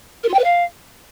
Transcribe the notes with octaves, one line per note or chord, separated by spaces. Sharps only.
A#4
F4
G5
B4
F5